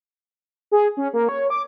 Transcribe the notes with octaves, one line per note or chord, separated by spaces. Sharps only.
G#4
C#4
A#3
C#5
D6